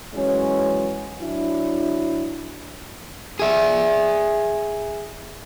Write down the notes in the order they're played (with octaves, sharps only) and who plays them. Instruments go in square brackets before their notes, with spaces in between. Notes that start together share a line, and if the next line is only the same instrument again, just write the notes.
[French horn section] E3 F#3 G#3 C#4
F#3 D4 E4
[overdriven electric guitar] G#4 E5